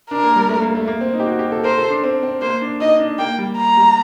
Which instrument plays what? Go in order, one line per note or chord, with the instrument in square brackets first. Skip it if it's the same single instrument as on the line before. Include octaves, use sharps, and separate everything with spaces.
[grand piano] D4 [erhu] A#4
[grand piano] A#3
G3
A3
A#3
A3
A#3
C4
D#4
G4
F#4
G4
A4
[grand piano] A#4 [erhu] C5
[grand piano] A4
D4
C4
C4
[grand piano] A#3 [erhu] C5
[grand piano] D4
[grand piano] D#4 [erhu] D#5
[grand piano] D4
[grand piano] A#3 [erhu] G5
[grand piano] G3
[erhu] A#5
[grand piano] G3